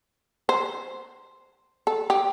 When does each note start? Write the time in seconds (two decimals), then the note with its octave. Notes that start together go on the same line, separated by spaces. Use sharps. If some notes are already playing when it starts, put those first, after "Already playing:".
0.49 C5
1.87 A4
2.10 G4